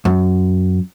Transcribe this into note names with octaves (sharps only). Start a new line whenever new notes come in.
F#2